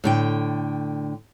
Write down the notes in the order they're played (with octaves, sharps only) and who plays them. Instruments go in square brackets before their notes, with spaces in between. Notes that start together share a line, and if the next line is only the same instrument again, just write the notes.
[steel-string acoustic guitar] A2 D3 G5